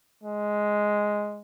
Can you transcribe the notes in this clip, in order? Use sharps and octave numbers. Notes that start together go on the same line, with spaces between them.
G#3